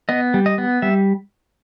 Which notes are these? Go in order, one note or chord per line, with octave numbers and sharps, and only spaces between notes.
B3 D#5
G3
D#5
B3
G3 E5